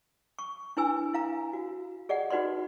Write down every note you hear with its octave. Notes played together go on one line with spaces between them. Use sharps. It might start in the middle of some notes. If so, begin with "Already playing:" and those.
C#6
D4 E4 B4 G#5 E6
E4 F5 A#5
F#4
G#4 D5 D#5 F#5
D#4 F#4 B4 D5 C6